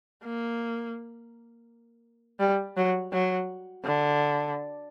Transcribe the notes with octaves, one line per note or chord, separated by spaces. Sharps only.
A#3
G3
F#3
F#3
D3